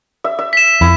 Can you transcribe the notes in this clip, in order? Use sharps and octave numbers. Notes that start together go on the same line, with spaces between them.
E5
E5
B6 E7
F2 E4